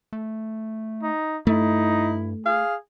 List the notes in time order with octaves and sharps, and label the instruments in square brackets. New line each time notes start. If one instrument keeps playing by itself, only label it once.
[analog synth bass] A3
[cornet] D#4
[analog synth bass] G2 [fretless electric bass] A3 [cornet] D#4 [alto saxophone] E4
[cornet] G#4 [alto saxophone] F5